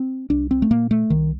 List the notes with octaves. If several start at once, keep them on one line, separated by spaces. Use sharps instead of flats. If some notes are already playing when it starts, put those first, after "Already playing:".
Already playing: C4
C2 D4
C4
A3
A#2 A#3
A3
C2 D#3